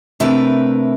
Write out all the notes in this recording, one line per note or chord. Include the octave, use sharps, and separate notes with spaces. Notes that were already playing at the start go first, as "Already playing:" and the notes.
C3 A3 D4 E4 A#4 B4